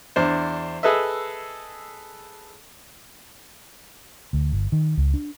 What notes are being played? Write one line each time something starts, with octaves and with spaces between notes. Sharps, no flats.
E2 D4 C5
G#4 A4 B4 D#5 E5
D2
G1
D#3
C#2
D4